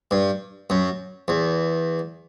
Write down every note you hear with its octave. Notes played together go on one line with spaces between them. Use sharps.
G2
F#2
E2